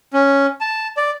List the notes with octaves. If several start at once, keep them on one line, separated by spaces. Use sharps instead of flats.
C#4
A5
D5